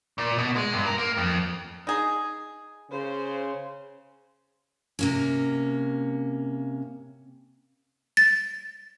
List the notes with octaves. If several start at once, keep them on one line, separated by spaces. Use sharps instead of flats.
A#2
B2
G#3
G2
A#4
A#3
F2
D#4 G#4
C#3 C5
C3 A#3 C#4
A6